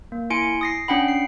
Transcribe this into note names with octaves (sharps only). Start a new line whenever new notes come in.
A#3
E4 G#5 C6 C#7 D7
D#6 A#6 C7
C#4 D4 F#5 G5 B5
C7